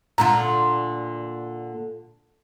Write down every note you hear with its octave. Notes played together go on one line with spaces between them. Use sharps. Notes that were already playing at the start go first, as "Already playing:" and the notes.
A#2 D3 F4 A#5